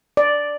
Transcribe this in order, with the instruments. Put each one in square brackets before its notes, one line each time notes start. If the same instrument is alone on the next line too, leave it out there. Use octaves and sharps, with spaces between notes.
[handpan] D5